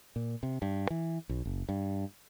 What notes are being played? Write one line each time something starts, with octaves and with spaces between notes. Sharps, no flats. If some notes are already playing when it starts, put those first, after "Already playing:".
A#2
C3
G2
E3
B1
F#1
G2